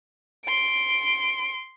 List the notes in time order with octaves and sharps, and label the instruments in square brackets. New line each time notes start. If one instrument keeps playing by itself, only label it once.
[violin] C6 D7